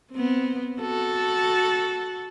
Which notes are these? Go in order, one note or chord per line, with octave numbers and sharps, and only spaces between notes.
B3 C4
F#4 A4